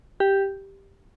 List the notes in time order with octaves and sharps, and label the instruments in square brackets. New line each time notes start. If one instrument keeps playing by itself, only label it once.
[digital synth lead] G4